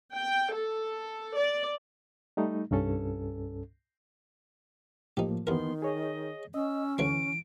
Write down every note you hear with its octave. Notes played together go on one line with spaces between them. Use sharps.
G5
A4
D5
G3 A3 D#4
C2 G2 C#4 A4
A2 F3 A#3 D#4 G4
D#2 D#3 E3 B3 A#4 C6
G#4 C#5 D#5
C#4 D#5 E6
D2 E3 C#5 C6 D7